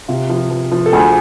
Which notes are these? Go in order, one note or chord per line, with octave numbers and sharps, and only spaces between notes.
C3 F4
F3
F3
F3
A4
D2 G#4